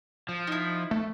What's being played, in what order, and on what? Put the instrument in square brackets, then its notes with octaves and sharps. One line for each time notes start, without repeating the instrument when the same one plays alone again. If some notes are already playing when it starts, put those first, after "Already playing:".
[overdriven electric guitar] F3
[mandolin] D#4 E4
[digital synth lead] A3